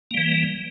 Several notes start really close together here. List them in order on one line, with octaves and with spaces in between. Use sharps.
A#3 G3 E3